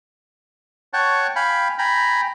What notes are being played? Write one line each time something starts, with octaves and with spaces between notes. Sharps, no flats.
C#5 F#5 G5 A5 C#6
F5 G5 G#5 B5
G5 G#5 A#5 B5